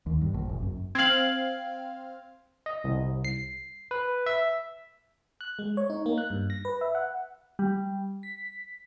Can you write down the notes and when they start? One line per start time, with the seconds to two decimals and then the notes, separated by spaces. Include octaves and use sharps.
0.06 D#2
0.21 G2
0.34 A#1
0.49 F#1
0.63 F#2
0.95 C4 F5 G#6 F#7
2.66 D#5
2.84 C2
3.25 C7
3.91 B4
4.26 E5
5.41 F#6
5.59 G#3
5.77 C#5
5.90 D#4
6.06 A#3
6.18 F#6
6.30 G2
6.50 A#6
6.65 B4
6.81 E5
6.95 F#5
7.59 G3
8.23 B6